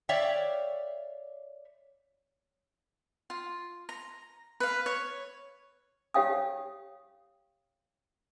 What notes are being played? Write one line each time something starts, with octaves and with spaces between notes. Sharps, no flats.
C#5 D5 E5 F5 G5
F4
A#5
B4 F5
C#5
G4 C#5 F5 G5 D#6